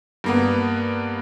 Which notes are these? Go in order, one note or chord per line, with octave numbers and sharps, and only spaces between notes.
G2 A#3 B3